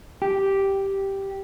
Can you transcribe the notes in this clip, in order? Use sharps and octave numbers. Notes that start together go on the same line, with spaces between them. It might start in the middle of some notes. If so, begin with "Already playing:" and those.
G4